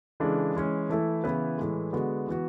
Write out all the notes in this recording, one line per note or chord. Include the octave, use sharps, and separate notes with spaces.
C#3 E3 G#3 D4 A4
E3 G#3 C#4
E3 A3 E4 A4
C#3 E3 B3 E4 B4
A2 E3 G#3
D3 G#3 B3 F#4
E3 B3 F#4